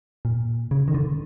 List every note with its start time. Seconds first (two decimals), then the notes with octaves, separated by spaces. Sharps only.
0.25 A#2
0.71 C#3
0.88 D#3
0.94 D3